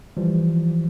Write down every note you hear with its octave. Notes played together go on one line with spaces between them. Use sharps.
E3 F3 G3